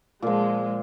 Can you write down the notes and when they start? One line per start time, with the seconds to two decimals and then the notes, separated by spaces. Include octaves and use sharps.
0.22 A#2 F3 G#3